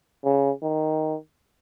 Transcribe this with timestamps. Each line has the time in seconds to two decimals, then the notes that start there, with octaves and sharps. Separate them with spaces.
0.24 C#3
0.62 D#3